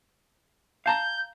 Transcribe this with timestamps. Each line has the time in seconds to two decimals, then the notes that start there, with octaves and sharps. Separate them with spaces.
0.86 F5 A5 A#5 G6